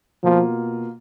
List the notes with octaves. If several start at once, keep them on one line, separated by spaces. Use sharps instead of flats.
B2 F3 A#3 F4